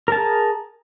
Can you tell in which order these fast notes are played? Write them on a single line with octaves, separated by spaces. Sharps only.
A#4 A5 G#4